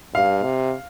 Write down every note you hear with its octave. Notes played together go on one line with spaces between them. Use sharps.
G2 F5
C3